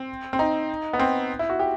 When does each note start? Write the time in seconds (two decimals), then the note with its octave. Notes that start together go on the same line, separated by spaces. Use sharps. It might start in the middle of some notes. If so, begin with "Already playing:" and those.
Already playing: C4
0.33 C4
0.39 D#4
0.93 B3
0.99 C4
1.39 E4
1.50 F#4
1.59 G4